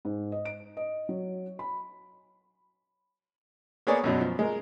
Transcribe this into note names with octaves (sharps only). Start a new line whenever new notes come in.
G#2
D#5
D7
D#5
F#3
B5
A#3 B3 G#4 C#5 D5
F#2 B2 F#3
F3
G#3 A#4